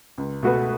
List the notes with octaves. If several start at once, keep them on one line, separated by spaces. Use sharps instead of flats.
C#2
B2 A3 F#4 B4